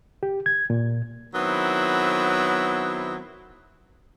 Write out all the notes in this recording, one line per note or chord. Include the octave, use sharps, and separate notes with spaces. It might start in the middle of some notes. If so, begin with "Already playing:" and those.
G4
G#6
A#2
D#3 F#3 B3 C4 E4